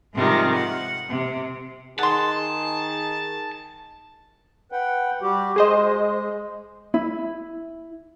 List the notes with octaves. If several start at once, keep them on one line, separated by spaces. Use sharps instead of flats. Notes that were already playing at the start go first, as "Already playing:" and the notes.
G#2 C3 D#3 F3 G3
F#5
C3
D#3 G#4 F#5 A5 C6
B4 F#5 G5
G3 F#4 G4
G#3 G#4 C5 D#5
E4